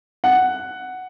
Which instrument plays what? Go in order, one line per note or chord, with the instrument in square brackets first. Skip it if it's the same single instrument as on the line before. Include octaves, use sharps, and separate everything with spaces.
[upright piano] F#5